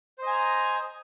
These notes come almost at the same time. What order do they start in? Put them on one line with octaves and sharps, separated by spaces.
C5 D#5 G#5 A#5